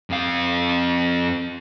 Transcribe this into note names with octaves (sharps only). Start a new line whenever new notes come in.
F2 F5